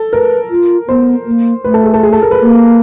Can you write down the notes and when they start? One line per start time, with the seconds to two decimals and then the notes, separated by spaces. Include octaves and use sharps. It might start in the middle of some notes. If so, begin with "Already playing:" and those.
Already playing: A4
0.12 A#4 B4
0.50 F4
0.88 B3 C5
1.26 A#3
1.64 A3 B4
1.74 A4
1.84 G#4
1.94 A4
2.03 G#4
2.13 A4
2.22 A#4
2.31 B4
2.41 A#3